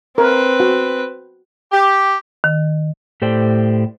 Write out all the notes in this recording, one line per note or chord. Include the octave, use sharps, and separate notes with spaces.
C4 A#4 B4
F#4
G4
D#3
A2 G4 A4 C5 D5 G5